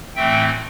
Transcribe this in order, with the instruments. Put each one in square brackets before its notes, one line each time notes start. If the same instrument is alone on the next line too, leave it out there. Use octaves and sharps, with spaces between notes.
[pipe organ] A2 E3 A3 C4 E5 G5